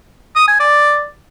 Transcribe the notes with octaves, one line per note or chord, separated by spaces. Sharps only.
D#6
G#5
D5